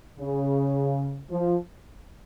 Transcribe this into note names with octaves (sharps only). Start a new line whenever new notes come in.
C#3
F3